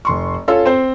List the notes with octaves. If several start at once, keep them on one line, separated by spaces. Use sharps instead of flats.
F1 C6 C#6
C#4 F4 A4 C#5 F5
C4 C5